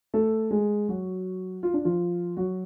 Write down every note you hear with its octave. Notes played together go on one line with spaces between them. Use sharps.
A3 A4
G#3 G#4
F#3 F#4
F4
D4
F3 F4
F#3 F#4